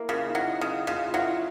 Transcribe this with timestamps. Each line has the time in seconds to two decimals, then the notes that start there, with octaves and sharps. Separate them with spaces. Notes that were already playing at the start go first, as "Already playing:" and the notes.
Already playing: A#3 E4
0.09 C#3 F4
0.27 D#4
0.35 F#3 E4
0.61 C#3 E4
0.87 C#3 F4
1.07 F4
1.14 F#3 E4